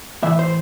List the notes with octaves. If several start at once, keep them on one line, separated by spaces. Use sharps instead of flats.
A2 E3 E5
C5